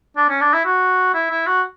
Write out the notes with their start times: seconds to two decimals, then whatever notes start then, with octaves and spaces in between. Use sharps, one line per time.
0.17 D4
0.29 C#4
0.41 D4
0.53 E4
0.65 F#4
1.14 E4
1.30 E4
1.47 F#4